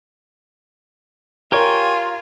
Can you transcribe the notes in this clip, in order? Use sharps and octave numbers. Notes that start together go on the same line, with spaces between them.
F4 G4 A#4 C#5 G5 G#5 C#6